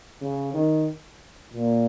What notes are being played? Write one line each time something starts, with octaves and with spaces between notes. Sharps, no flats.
C#3
D#3
A#2